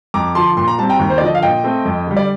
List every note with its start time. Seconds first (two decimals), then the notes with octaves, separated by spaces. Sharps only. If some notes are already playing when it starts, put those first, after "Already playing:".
0.14 F2 A#5 D6
0.35 D3 F3 A5 C6
0.57 A#2 C6
0.68 A#5
0.78 G3 C4 A5
0.90 G5 A#5
0.99 D#2
1.10 C5
1.18 D5
1.21 D3 F3 D#5
1.35 F5
1.43 A#2 D#5 G5
1.64 A3 C4
1.85 F2
2.07 D3 G3
2.17 D5